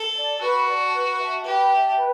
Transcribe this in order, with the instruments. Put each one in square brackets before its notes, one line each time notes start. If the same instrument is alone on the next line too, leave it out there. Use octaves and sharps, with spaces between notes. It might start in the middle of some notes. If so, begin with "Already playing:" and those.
Already playing: [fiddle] A4
[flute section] D5 A5
[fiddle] F#4 [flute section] B4
[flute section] D5 A5
B4
E5 A5
[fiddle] G4 [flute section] B4
[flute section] E5 A5
B4